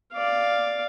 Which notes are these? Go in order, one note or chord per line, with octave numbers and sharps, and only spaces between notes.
D5 F5